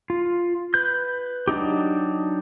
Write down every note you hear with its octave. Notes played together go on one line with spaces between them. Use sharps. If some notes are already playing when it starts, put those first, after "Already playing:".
F4
B4 G6
F#3 D4 D#4 G4